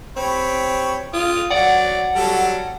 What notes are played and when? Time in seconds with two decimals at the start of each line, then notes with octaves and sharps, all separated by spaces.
0.16 C4 G4 C#5 B5
1.13 F4 D#6
1.51 F#3 D5 F#5
2.15 F#3 G3 A4